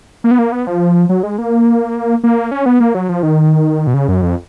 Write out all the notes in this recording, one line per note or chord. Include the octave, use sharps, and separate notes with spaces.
A#3
B3
A#3
B3
F3
F#3
G#3
A#3
A#3
C#4
B3
A#3
F#3
F3
D#3
B2
C#3
F#2
F2